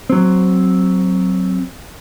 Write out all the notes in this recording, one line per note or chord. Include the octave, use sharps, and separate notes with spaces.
F#3 C4